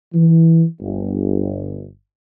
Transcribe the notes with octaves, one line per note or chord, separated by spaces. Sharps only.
E3
G1